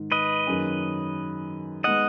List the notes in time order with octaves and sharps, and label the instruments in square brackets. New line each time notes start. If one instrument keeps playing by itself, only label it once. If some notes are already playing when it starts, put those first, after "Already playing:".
Already playing: [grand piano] G#2 D#3
[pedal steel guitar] B4 D#5
[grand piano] F#2 D#3 A#3 C#4 G#4
[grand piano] G#3 B3 D#4 G#4 [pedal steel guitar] D#5 F#5